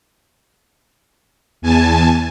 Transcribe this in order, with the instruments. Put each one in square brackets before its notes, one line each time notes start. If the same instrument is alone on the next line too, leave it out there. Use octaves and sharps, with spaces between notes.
[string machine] E2 G#5 A5